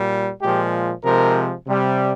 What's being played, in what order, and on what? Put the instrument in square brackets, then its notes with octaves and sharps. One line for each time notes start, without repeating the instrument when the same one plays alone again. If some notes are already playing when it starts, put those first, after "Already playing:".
Already playing: [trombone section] A#2 G3
A#2 F3 G#3 G4
C3 F3 G#3 A#4
C3 G3